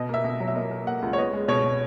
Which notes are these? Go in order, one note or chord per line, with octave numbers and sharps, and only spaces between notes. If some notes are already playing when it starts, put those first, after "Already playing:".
Already playing: B2 D#5
A#3 E5
B2
F#3
E5
A#3 D#5
A#3
A#3 F#5
C#2
C#5
B3 D#5
G#3
B2 C#5
B2